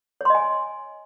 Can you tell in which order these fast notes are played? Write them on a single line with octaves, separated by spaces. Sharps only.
C#5 C6 D#5 G#5